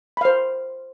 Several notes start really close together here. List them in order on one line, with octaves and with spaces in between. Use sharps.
B5 F5 C5